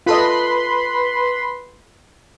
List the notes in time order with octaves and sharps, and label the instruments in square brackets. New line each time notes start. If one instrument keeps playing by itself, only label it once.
[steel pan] F4 A4 D#5 [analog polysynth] B4 B5 C6